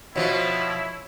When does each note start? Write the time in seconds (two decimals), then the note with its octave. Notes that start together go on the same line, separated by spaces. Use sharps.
0.16 B2 F3 E4 C#5